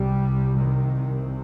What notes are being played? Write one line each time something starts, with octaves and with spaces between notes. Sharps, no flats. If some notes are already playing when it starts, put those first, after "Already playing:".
Already playing: C2 C3 G3
D#3